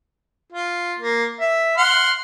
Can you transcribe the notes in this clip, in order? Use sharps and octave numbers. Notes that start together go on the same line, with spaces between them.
F4
A#3
E5
F#5 C6 F6